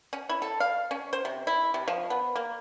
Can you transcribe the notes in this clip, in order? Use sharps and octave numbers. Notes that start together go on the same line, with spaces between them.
C#4
E4
A4
F5
C#4
C5
C3
E4
C3
F3
B3
A#3